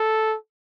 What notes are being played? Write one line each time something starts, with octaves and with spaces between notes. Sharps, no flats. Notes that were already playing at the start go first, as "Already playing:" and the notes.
Already playing: A4